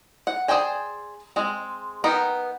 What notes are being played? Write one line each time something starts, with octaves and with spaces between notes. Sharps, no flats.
F#5
G#4 C5 D5 G5 G#5
G#3 C4
B3 D#4 A#4 G5